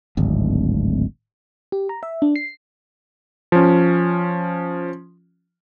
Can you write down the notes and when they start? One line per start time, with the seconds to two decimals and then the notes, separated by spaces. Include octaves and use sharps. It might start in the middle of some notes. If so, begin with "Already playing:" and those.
0.17 D1 G#1
1.72 G4
1.89 A#5
2.03 E5
2.22 D4
2.36 C7
3.52 F3 C#4